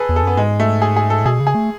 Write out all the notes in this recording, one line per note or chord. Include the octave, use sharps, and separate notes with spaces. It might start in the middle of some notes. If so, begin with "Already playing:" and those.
Already playing: G#4 A4 B4
E2
A4
F#2 B3
G#2 G#3
A3
G#4
G#4
A4
A2
B2 G#4
C#3
G#4
A3